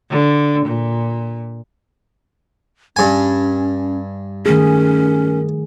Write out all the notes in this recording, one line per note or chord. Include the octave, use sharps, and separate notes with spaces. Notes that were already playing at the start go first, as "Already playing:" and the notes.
D3
A#2
G2 C#4 G#5
D#3 A3 C#4 G#4 A#4